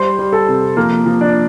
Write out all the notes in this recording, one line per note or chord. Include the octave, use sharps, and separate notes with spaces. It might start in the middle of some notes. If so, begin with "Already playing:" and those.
Already playing: G3 C5 C6
G3
A4 A5
C3
F3 A#3 A#4
F3
D4 D5